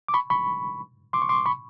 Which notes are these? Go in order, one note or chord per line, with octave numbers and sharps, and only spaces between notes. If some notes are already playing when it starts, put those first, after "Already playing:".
D6
B5 C#6
B5 C#6
C6 D6
C#6
C6 D6
B5 C#6